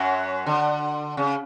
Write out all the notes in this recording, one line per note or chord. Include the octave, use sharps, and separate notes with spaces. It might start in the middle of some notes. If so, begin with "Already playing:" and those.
Already playing: F#2 F#3
D3
C#3